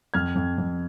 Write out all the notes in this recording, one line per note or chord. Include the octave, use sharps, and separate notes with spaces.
F2 F6 G#6
F2
F2